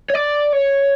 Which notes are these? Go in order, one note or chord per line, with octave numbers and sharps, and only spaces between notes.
C#5
D5
C#5